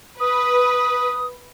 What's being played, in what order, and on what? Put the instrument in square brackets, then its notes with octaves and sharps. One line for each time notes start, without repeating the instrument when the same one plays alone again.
[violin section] B4 [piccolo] D#6